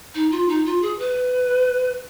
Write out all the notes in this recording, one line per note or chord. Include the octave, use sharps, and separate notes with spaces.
D#4
F4
D#4
F4
G#4
B4